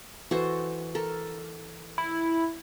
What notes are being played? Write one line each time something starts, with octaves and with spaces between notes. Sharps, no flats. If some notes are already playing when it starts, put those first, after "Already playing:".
E3 F#4 A4 C5
A4 A#4
E4